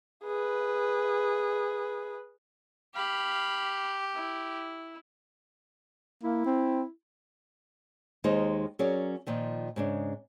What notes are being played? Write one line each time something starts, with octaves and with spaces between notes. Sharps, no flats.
G#4 B4
G4 F5 B5
E4
A#3 E4
C4
D#2 D#3 G#3 D#4 C5
F#3 C#4 G#4 A#4 D5
A#2 D#3 F3
G#2 C#3 D4